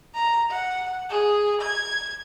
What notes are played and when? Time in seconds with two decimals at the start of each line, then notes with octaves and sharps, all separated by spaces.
0.15 A#5
0.51 F#5
1.10 G#4
1.62 G#6